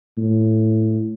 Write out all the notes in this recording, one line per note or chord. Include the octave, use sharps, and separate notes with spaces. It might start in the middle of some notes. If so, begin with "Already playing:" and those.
A2